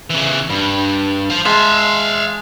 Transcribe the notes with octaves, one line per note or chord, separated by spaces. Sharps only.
C#3 E3
G2 B5
C5 F5
G#3 E5 F5 A5